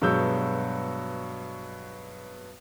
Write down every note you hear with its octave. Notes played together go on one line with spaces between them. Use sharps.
G2 B2 F#3 G#3 E6 G6